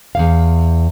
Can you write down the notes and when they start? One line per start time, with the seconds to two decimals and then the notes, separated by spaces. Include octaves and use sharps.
0.15 E2 C3 F5